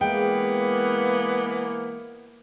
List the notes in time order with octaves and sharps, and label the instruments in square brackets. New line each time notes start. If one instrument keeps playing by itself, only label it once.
[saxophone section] E3 A#3 [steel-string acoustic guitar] G#3 [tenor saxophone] B3 [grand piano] G5